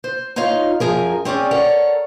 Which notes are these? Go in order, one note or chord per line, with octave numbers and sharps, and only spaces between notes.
C5
D#4 F4 C#5 D#5 F5
F#2 E3 F3 G#4 A#4
C4 C#4 G#4 D5
A4 A#4 C#5 D5 F#5